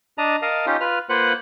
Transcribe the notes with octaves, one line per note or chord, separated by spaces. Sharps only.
D4 D#5 A5 A#5
A#4 D#5 F5 A5
C#4 D#4 F4 G4
F4 B4 F6
A#3 F4 B4 C5 F#5 F#6